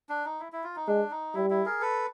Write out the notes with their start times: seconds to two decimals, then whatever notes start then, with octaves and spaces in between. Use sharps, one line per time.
0.09 D4
0.25 D#4
0.40 E4
0.52 E4
0.64 F4
0.76 D#4
0.87 G#3 D4
1.11 D#4
1.35 G3 E4
1.50 E4
1.66 G#4 A#4
1.81 A4 B4